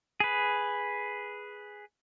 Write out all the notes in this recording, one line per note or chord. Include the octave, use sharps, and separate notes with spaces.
G#4 B4